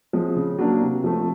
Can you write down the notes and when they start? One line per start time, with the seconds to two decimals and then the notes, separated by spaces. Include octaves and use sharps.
0.13 F3 G#3 C4
0.36 C#3
0.59 F#3 A#3 D4
0.82 C3
1.04 F3 A3 C4